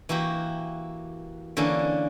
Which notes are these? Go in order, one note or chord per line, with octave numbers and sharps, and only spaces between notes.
E3 A#3 F#4 G4
D3 E3 A#3 C#4